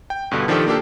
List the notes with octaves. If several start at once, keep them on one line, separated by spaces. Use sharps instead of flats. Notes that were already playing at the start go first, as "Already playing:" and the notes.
G5
G2 B2 D3
D#3 F3 D4 D#4 G4 A4
A#3 D4 G4 A4